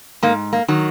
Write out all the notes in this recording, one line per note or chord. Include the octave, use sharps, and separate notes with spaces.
G#2 A#3
A#3
D#3 F#3